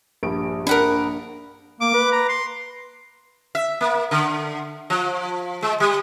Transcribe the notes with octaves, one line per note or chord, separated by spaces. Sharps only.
A#1 G2 D7
D4 A#4 F#5 B5
A#3 D6
B4
A#5
C6
E5
A#3
D3
F3
G#3
G3